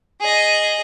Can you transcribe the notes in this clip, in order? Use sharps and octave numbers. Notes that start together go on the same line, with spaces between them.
G#4 D#5